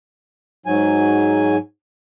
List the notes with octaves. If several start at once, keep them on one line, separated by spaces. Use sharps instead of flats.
G#2 F#3 G#5